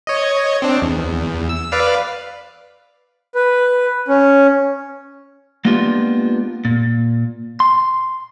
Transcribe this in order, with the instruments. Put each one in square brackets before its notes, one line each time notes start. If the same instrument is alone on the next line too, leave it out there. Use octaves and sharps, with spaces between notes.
[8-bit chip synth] C#5 D#5
C4 D4
E2
E6
B4 D5 F5
[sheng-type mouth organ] B4
C#4
[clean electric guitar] G#3 A#3 B3 D4 F4 G4
A#2
C6